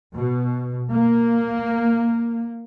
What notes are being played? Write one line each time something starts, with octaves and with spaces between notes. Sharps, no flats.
B2
A#3